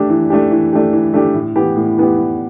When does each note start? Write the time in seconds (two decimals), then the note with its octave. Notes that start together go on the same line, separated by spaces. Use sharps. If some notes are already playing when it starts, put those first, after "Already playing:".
Already playing: A3 D4 G4
0.10 E3
0.30 A3 D4 G4
0.51 E3
0.73 A3 D4 G4
0.93 E3
1.14 A3 D4 G4
1.34 A2
1.56 E3 B3 G4
1.76 A2
1.98 E3 B3 G4
2.17 A2